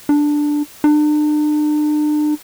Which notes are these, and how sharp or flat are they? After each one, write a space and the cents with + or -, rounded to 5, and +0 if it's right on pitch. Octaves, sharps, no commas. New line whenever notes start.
D4 +5
D4 +40